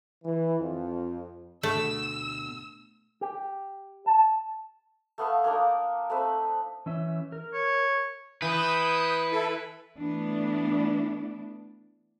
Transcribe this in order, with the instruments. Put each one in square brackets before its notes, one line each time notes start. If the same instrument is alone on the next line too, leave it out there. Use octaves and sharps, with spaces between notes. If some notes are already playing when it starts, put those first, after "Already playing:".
[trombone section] E3
F2
[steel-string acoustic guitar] D2 B2 [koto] A3 [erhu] E6
[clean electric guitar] G4
A5
[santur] A3 B3 F5 C#6
A#3 D4 D#4 A#4
A3 C4 B4
[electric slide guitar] E3 C#4 E5
A#4
[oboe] C#5
[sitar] E3 [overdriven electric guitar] B4 [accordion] D#6 G6
[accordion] E4 A4 E5
[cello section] E3 A3 B3 D4